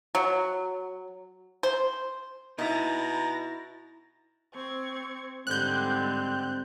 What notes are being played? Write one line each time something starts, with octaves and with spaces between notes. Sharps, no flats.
F#3
C5
B2 D#4 E4 A#5 A6 A#6
C4 C#6 G#6
G#2 D3 G3 C4 F#6 G6